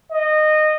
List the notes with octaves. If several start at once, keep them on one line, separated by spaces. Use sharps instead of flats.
D#5